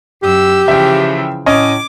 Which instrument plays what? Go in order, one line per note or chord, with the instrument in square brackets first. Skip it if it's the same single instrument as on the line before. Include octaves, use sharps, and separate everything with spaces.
[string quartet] F#2 E6 [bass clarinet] G4
[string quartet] C#3 E3 F3 [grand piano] E5 G5
[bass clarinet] A2 [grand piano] C#4 D#5 [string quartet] D6